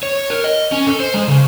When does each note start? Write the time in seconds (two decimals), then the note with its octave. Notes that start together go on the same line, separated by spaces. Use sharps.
0.03 C#5
0.30 A#4
0.44 D#5
0.72 C#4
0.87 A4
1.00 C5
1.14 G#3
1.28 C#3